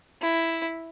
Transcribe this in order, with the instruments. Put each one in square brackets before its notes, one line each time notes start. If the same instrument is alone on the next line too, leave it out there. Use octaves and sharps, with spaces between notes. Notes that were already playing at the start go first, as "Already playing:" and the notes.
[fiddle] E4